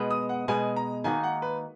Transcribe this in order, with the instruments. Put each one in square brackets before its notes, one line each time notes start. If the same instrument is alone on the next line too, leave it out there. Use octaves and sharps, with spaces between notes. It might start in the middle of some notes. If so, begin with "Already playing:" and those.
Already playing: [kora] B2 G#3 B3
[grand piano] D#6
F#5
[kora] B2 G#3 B3 [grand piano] G#5
[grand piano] A#5
[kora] D#3 A#3 D#4 F#4 [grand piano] G#5
[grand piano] F#5
B4